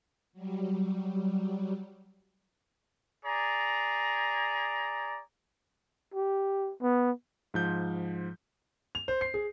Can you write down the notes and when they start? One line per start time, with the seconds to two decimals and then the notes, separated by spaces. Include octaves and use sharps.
0.33 F#3 G3
3.24 G#4 D5 A#5
6.14 G4
6.82 B3
7.54 G#2 F3 G6
8.95 F7
9.08 C5
9.21 C7
9.34 G#4